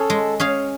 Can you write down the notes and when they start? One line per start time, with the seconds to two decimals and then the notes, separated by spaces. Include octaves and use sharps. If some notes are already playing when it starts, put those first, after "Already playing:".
Already playing: C#4 G#4 A4 C#5 F5
0.10 G#3
0.40 C#4 G#4 C#5 F5